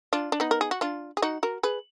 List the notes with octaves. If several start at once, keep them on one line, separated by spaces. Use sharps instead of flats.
D4 F4
D4
B3 D#4
A#4
G#4
F#4
D4 F4
G#4
D#4 F#4
F#4 A#4
G#4 B4